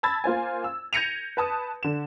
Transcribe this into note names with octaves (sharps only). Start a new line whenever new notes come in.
A5 B5 E6 G#6 A6
A#3 F4 C5 G#5
E6
G6 G#6 A#6 C#7 D#7 F7
B4 A5 D#6
D3 E7